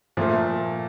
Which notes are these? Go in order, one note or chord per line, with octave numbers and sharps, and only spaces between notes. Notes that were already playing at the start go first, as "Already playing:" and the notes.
A#2 F3 A3